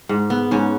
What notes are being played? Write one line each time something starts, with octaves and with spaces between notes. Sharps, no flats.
G#2
B3
G#2 C#4